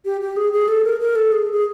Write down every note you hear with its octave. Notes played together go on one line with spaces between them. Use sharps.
G4
G4
G#4
G#4
A4
A#4
A#4
A4
G#4
G#4